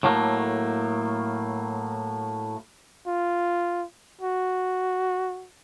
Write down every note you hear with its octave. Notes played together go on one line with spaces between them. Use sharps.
A2 F#3 A3 A#3
F4
F#4